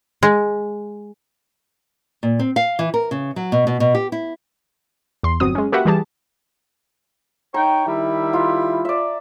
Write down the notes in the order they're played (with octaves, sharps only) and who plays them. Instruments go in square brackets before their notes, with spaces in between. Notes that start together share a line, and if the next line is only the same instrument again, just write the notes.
[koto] G#3
[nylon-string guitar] A#2
C4
F5
E3
A#4
C#3
F#3
B2
B2
B2
G4
E4
[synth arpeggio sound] E2 C6
G1 F#3 C4 D#6
G#3 C#4
A#3 F#4 G4 B4 E5 F#5
E3 G3 G4 G#4 A5
[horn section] D#4 C#5 G5 [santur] A#5
[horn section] D#3 G3 E4
[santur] F4
D5 E5